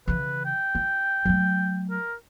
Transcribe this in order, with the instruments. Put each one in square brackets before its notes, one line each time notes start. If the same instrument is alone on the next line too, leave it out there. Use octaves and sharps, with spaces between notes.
[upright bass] C#3 E3 [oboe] B4
[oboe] G5
[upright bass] F4
F#3 A3
[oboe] A#4